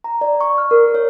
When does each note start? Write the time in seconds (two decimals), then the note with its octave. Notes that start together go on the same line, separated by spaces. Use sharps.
0.04 A#5
0.21 D5
0.41 C#6
0.58 F6
0.71 A#4
0.95 C#5